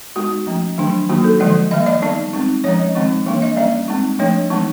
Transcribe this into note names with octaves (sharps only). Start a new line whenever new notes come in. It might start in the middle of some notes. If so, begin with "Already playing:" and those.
G#3 B3 D#4 F#4
F3 A3 C#4
D#3 F#3 A3 D4
D#3 F#3 A#3 D#4 F#4
A4
D3 F3 G#3 D5
D#3 G3 A#3 D#5
D5
G3 B3 D#4 D5
G#3 C4 D#4
F3 G#3 C#4 C#5
D#5
D#3 G#3 C4 D#4
E3 G3 A#3 D4
D#5
G3 A#3 C#4 D5
G#3 C4 D#4
F3 A3 D4 C#5
E3 G#3 B3 D#4